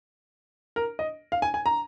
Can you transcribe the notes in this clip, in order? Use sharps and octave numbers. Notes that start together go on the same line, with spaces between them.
A#4
D#5
F5
G#5
G#5
A#5